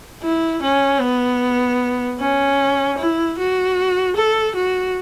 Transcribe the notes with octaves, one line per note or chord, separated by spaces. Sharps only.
E4
C#4
B3
C#4
E4
F#4
A4
F#4